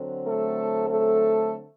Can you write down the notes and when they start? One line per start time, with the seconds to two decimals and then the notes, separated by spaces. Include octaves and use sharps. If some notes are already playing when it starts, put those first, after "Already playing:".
Already playing: D3 F#3 C4
0.27 A3 A4
0.90 A3 A4